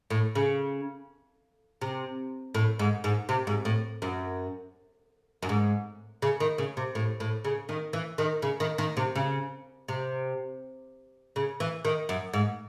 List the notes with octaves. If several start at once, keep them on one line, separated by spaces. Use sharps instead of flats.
A2
C#3
C3
A2
G#2
G#2
C3
G#2
A2
F#2
F#2
G#2
C#3
D#3
C#3
C3
A2
A2
C#3
D#3
E3
D#3
C#3
D#3
D#3
C3
C#3
C3
C#3
E3
D#3
F#2
G#2